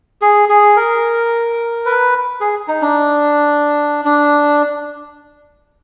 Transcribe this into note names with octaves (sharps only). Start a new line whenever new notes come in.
G#4
G#4
A#4
B4
G#4
D#4
D4
D4